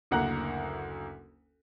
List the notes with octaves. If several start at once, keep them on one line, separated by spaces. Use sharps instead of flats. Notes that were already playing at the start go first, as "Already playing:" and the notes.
F#1 D2 A#3 F#5 A#5 F#6